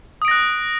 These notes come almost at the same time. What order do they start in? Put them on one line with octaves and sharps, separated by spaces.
D#6 D7 A#6 F#6